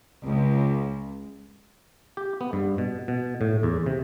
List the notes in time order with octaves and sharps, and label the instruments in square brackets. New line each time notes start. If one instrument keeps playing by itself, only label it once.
[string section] C#2
[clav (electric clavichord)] G4
B3
G2
B2
B2
A2
E2
C3